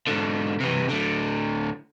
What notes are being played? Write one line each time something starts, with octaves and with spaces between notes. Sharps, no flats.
G#2 D3
C3 E3
A2 D3